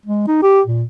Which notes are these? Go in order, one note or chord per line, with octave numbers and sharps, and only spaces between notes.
G#3
D#4
G4
A#2